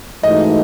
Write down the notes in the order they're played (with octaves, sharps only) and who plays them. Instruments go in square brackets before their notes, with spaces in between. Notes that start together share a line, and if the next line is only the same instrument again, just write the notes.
[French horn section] G#2 E3 A3 D#4 F#4 [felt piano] D#5